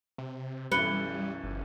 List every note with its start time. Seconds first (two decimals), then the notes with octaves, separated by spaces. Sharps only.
0.18 C3
0.72 B1 F#2 E3 G3 B4 F#6 C#7 G7
1.44 G1